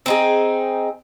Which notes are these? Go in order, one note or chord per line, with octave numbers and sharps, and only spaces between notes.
C4 D#4 G#4